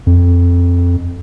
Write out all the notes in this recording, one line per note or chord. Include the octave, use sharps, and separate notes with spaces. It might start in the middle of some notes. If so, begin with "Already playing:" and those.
F2